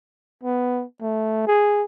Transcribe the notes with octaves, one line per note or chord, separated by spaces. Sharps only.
B3
A3
G#4